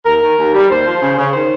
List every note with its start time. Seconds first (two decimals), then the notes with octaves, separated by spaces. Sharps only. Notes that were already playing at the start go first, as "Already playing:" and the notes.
0.05 D#2 A#4
0.22 D#3
0.37 D#2
0.54 G3
0.69 D#2 C5
0.86 F3
1.01 C#3
1.18 C#3
1.34 D#3 C5